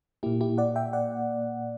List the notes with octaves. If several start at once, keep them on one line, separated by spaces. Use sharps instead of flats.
A#2 A#3 E4 G4
E4 G4
D5 F#5
E5 G5
D5 F#5